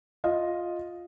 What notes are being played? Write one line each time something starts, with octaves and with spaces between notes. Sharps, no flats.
F4 D#5